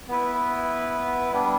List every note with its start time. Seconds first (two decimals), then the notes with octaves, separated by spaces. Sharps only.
0.08 B3 E4 B4 E5
1.32 G3 B3 D4